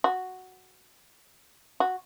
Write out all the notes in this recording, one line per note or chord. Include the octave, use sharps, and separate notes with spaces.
F#4
F#4